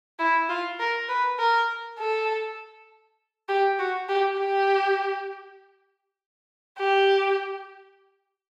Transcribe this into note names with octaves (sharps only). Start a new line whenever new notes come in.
E4
F4
A#4
B4
A#4
A4
G4
F#4
G4
G4
G4